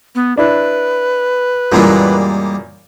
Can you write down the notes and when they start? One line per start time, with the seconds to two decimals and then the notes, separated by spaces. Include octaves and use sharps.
0.15 B3
0.37 D4 E4 B4
1.72 F#2 A#2 E3 G3 G#3 A#3